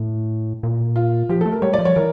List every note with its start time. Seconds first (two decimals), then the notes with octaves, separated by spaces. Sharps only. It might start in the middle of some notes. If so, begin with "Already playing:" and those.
Already playing: A2
0.63 A#2
0.96 F4
1.29 F3 G4
1.41 A3 A4
1.52 A#4
1.62 G3 C#5
1.74 D5
1.79 F3
1.85 C#5
1.96 E3 A#4